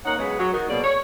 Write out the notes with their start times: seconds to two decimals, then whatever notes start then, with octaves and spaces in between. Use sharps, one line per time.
0.05 A#3 C#4 D#4 F#5
0.18 C#3 F#3 G#3 B3
0.39 F#3
0.54 D#3 D#4 F#4 A#4 D#5
0.69 B2 F#3 A#3 G#4 D5
0.83 C#5